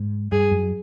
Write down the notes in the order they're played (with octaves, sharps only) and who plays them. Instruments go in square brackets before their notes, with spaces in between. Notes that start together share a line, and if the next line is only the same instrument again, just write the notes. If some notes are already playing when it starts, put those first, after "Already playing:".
Already playing: [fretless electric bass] G#2
[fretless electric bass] G2 [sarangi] G#4
[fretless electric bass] F#2